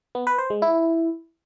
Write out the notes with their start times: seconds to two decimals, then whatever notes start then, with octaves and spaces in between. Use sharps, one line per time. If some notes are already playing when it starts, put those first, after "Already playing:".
0.15 B3
0.27 B4
0.39 C5
0.50 G#3
0.62 E4